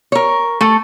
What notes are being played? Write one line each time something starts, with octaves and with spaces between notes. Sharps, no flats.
A#4 C#5
A3 A4